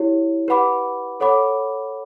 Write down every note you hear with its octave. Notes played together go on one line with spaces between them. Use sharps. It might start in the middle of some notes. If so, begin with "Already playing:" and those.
Already playing: E4 G4 C#5
G4 B4 F#5 B5 D6
A4 C#5 F#5 B5 D6